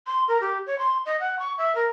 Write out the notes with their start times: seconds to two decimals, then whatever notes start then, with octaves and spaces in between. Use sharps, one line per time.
0.07 C6
0.28 A#4
0.41 G4
0.66 C#5
0.79 C6
1.06 D#5
1.20 F#5
1.39 C#6
1.58 E5
1.75 A#4